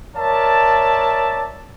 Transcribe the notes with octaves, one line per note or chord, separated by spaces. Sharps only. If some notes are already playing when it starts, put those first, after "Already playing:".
A#4 C#5 D5 E5 A5